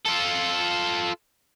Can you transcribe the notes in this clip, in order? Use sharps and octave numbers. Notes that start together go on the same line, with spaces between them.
F4 A4